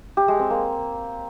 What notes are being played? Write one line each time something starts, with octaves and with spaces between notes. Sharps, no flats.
G4
G#3
C4
A#3